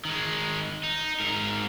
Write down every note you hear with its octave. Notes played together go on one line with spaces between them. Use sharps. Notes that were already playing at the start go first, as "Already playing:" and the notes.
D#3 G#3
D#4
G#2 A#4